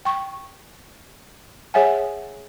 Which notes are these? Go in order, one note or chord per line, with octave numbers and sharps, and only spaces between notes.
G5 C#6
G#4 C#5 E5 F#5 G#5